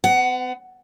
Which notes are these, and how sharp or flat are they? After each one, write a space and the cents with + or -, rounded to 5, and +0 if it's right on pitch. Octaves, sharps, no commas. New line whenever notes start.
B3 +45 F#5 +20